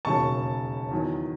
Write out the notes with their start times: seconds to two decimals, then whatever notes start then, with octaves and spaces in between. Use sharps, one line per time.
0.05 E1 D#2 C#3 F#3 A5 C#6
0.91 E2 D#3 F#3